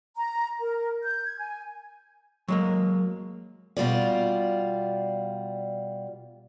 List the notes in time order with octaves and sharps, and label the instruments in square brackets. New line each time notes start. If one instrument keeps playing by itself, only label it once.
[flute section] A#5
A#4
G6
G#6
G#5
[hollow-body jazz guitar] F#3 G#3 A#3
[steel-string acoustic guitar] B2 G3 F4 D5